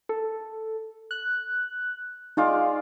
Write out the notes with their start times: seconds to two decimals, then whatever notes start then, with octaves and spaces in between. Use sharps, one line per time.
0.09 A4
1.11 F#6
2.37 G#3 D#4 F4 D5